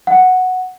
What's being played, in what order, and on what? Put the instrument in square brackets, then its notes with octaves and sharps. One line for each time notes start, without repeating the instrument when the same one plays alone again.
[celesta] F#5